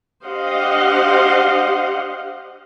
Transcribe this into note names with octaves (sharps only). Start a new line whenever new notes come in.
D4 G4 C5 D#5 F5 F#5